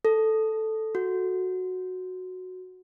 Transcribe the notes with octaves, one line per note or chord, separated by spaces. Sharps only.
A4
F#4